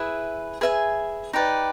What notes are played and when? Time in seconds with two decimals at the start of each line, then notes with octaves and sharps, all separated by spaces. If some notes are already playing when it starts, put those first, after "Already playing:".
Already playing: E4 G#4 B4 E5
0.61 G#4 B4 E5 G#5
1.33 D#4 G4 B4 D5